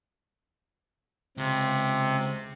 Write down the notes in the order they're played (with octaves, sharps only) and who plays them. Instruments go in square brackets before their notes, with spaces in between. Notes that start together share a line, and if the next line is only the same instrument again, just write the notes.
[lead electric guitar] C#2 [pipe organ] C3